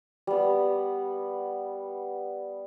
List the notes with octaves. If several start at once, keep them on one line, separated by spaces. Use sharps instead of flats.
G3 B3